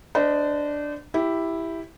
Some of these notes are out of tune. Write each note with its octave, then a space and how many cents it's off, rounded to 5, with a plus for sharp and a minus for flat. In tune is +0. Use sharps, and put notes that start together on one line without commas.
D4 +0 C5 -35 D#5 +0
E4 +0 G4 +0